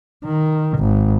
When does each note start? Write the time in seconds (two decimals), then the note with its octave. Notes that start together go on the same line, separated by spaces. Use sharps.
0.24 D#3
0.78 G#1